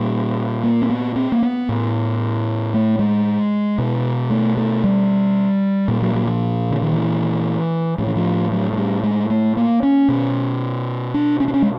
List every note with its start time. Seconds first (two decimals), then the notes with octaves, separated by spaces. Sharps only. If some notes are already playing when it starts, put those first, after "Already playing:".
Already playing: A#2 G3
0.63 A#3
0.82 C4
0.89 B3
1.16 C4
1.32 A#3
1.42 B3
1.69 A2
2.74 A3
2.99 G#3
3.78 B2
4.30 A3
4.57 A3
4.84 G3
5.88 A#2 G3
6.02 F#3
6.15 F#3
6.27 F3
6.71 D3
6.82 D#3
6.93 E3
7.98 A2 F3
8.07 E3
8.16 F3
8.52 F#3
8.73 G#3
8.77 G3
9.03 G#3
9.30 A3
9.57 A#3
9.83 C#4
10.08 B2
11.14 D4
11.40 C#4
11.48 D4
11.54 C#4
11.62 G#3